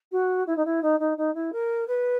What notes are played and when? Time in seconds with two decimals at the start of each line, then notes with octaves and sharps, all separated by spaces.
0.12 F#4
0.47 E4
0.56 D#4
0.65 E4
0.82 D#4
0.99 D#4
1.17 D#4
1.34 E4
1.52 A#4
1.87 B4